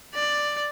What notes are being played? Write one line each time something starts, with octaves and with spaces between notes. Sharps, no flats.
D5